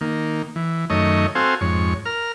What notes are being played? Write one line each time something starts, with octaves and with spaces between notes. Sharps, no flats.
D#3 A#3
E3
F#2 D#3 A3 C#5 D#5
C4 F#4 A4 C5 F5 G#5
F2 G#2 C#5
A#4 F6